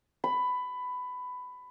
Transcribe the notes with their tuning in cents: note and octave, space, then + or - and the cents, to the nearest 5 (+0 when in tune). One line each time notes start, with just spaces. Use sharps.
B5 +15